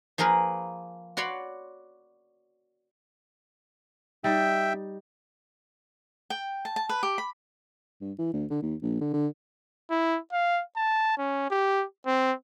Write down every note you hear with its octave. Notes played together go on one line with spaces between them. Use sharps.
F3 A#3 G#4 A#4 B4
F#4 C#5 D5 B5 C6
G3 D#4 E5 G5
G5
A5
A5
B4
G4
B5
G2
E3
D2
D3
D#2
A#1
D3
D3
E4
F5
A5
C#4
G4
C4